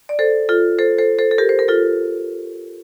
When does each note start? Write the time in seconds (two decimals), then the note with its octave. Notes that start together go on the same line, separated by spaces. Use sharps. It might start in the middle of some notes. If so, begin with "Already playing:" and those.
0.09 D5
0.19 A4 C5
0.49 F4 A4
0.78 A4 C5
0.99 A4 C5
1.19 A4 C5
1.31 A4
1.38 G4 A#4
1.49 C5
1.59 A#4
1.68 F4 A4